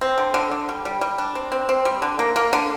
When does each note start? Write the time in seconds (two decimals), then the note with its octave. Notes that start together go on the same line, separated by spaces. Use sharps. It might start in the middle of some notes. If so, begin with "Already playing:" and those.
0.01 C4
0.18 D3
0.34 D3
0.51 D3
0.69 G3
0.85 G3
1.01 G3
1.18 D4
1.35 C4
1.52 C4
1.69 C4
1.85 G3
2.02 D3
2.19 A#3
2.36 A#3
2.53 D3